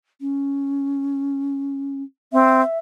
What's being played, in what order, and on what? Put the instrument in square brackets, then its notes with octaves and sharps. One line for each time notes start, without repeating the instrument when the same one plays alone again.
[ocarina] C#4
[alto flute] C4 [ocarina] E5